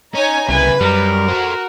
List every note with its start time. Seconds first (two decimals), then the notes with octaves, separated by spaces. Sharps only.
0.14 C#4 D#4 C#5 G#5 A#5
0.49 C2 C#3 E4 B4 G#5
0.81 F#2 G3 A#4
1.29 F#4 A4 C5